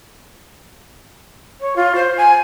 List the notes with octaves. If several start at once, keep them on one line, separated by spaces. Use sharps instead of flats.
C#5
F4
C5
G#5